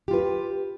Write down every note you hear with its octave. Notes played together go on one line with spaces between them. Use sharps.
F4 G4 B4